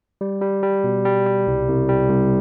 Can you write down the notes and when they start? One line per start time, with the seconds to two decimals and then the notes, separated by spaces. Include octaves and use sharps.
0.21 G3
0.42 G3
0.63 G3
0.84 B2
1.05 G3
1.26 G3
1.47 C2
1.68 C2
1.89 G3
2.10 C2